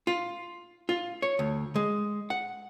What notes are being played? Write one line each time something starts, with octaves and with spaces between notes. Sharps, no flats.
F4
F4
C#5
D2
G#3
F#5